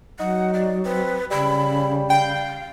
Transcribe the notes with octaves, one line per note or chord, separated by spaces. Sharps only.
F#3 D#4 F#5
D5
C4 B4
C#3 G3 B5
F5 G5